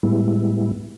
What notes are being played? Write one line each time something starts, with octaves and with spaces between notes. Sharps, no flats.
A2 G3 G#3 B3 E4